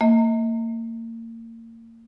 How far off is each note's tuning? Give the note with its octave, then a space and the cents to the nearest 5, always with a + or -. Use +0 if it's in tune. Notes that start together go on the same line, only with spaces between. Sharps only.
A#3 -35 D#5 +45